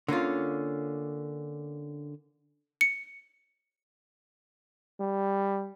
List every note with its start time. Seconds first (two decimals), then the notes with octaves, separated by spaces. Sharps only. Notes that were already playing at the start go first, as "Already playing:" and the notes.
0.08 D3 A#3 C#4 F4
2.81 C#7
5.00 G3